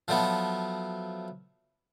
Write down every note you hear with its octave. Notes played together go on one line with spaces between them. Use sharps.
F3 F#3 A3 B3